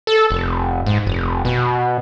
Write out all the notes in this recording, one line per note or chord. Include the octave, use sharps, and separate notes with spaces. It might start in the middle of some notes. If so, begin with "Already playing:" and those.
A4
F1
G#2
F1
B2